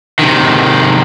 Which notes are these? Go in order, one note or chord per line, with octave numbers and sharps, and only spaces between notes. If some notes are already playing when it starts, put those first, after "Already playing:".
C3 D#3